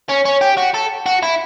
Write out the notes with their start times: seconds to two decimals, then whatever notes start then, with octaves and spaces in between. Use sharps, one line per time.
0.09 C#4
0.25 C#4
0.41 G4
0.58 F#4
0.74 A4
1.06 F#4
1.23 E4